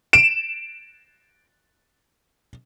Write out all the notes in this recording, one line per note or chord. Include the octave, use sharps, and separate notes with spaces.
D7 E7